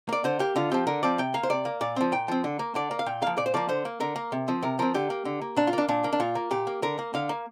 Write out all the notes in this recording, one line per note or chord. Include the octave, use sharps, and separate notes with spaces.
A#3 D5
D3 C5
A#3 G4
D3 F4
F3 C4 G4
D3 A#4
F3 C4 D5
C3 G5
A#3 F5
C5
C3 D5
A#3
A#2 D5
F3 C4
A#2 G5
F3 C4
D3
A#3
D3 D5
A#3
F5
A#2 G5
F3 A#3 F5
A#2 D5
C5
F3 A#3 D5
D3 C5
A#3
D3 A#4
A#3
C3
F3 C4
C3 A#4
F3 C4 A#4
D3 G4
A#3
D3
A#3
A#2 D4
F4
A#3 D4
A#2 D4
A#3
D4
A#2 F4
A#3
A#2 G4
A#3
D3 A#4
A#3
D3 F5
A#3